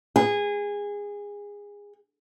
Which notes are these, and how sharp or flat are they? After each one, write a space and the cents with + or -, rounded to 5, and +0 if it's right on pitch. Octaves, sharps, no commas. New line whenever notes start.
G#4 -20